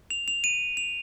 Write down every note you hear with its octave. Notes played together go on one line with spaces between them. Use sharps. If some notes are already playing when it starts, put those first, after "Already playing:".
F7
F7
D#7
F7